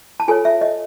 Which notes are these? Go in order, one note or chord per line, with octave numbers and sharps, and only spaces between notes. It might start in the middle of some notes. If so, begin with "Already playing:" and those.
A5
F4 A4 C#5 G#5
E5
D#5